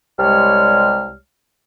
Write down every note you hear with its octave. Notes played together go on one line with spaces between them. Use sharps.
C2 G3 G#3 C#5 F6